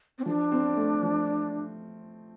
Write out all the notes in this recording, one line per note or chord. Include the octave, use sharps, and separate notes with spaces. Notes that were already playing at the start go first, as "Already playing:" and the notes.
C4
F3 D4
C4
A3
F3